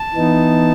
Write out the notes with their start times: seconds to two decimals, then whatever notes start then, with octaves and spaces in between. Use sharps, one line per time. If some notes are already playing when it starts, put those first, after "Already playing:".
Already playing: A5
0.14 E3 B3 D#4